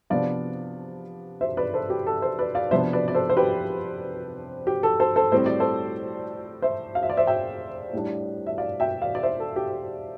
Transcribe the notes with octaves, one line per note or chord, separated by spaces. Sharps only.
C3 F3 B3 D4 D5 F5
C5 E5
B4 D5
A4 C5
G4
A4
A4 C5
B4 D5
D5 F5
C3 F3 B3 D4 C5 E5
B4 D5
D5
A4 C5
C5
G4 B4
G4
A4
A4 C5
A4 C5
A2 G3 C4 C5
D5
A4 C5
C5 E5
F5
E5
D5
C5 E5
E5 G5
A2 G3 D4
E5
D5 F5
E5 G5
D5 F5
D5
C5 E5
A4
G4